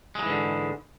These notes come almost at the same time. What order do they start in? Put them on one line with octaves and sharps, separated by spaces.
G#3 F#3 E3 G#2 D3